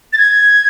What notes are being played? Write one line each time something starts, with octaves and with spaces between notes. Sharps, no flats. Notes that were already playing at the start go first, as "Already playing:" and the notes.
A6
G#6